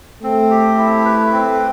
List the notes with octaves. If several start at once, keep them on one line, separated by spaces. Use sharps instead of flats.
A3 C4
G4
E4
B4
C4